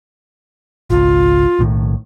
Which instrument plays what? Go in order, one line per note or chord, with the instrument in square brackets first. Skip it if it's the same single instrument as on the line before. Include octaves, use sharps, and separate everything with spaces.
[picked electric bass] G#1 C#2 [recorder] F4
[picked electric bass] B1 A2 D#3